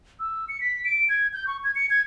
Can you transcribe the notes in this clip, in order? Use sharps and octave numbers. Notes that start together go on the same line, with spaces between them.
E6
C#7
B6
D7
G#6
G6
C#6
G#6
C#7
G#6